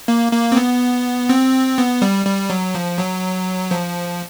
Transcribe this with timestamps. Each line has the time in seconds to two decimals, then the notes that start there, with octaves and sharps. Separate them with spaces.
0.08 A#3
0.32 A#3
0.52 C4
0.57 B3
1.29 C4
1.78 B3
2.02 G3
2.26 G3
2.50 F#3
2.75 F3
2.99 F#3
3.71 F3